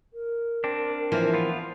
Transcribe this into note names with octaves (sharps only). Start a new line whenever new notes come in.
A#4
C4 D4
E3 F3 A#3
B3 F4